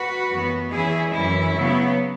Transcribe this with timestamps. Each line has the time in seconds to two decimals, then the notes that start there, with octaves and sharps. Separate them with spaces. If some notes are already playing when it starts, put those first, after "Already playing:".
Already playing: F#4 B4
0.30 F#2 E3 B3
0.71 E2 E3 C#4 E4 G#4
1.13 F#2 E3 C#4 E4
1.55 C#3 F#3 B3